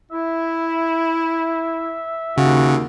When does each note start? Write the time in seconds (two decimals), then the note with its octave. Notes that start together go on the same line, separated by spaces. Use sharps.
0.11 E4 E5
2.38 D#2 C#3 F#4